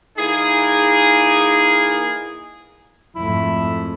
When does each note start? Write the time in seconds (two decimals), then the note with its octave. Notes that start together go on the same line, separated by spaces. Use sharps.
0.17 E3 A#3 D#4 G#4
3.16 F2 G#2 A3 E4